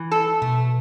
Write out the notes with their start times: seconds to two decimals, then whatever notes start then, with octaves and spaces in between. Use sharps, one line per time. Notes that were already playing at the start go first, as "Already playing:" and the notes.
Already playing: E3
0.11 A4
0.42 B2 A3